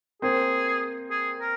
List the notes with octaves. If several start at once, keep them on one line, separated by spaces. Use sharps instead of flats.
A#3 C4 G#4
G#4
A#4